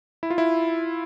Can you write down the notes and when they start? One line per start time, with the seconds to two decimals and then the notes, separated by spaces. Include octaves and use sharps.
0.23 E4
0.30 F4
0.38 E4